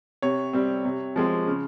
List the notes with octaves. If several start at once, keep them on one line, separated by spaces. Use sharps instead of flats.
C3 C#5
G3 C4
C3
F3 G#3 C4
C#3